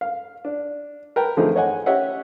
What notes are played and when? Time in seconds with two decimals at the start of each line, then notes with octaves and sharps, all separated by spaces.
0.01 F5
0.45 D4
1.16 A#4 B4 G5 A5
1.37 D3 F3 A3 C4 D#4 G#4
1.55 C#5 D#5 F#5 G#5
1.86 C#4 G4 C#5 D#5 E5 F#5